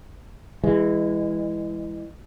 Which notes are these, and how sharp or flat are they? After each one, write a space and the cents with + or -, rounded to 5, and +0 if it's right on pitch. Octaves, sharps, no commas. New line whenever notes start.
E3 +0 G#3 -25